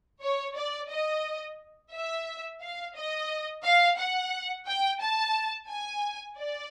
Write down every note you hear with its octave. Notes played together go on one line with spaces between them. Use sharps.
C#5
D5
D#5
E5
F5
D#5
F5
F#5
G5
A5
G#5
D5